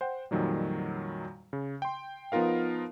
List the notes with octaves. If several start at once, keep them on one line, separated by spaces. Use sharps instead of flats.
C5 F#5 G5
F2 A#2 D#3 F#3 G3
C#3
G5 C6
F3 B3 D#4 F4 A#4 F5